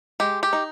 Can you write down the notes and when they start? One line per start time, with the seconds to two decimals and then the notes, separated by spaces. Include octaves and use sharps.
0.20 G#3 G4
0.43 G4
0.53 D#4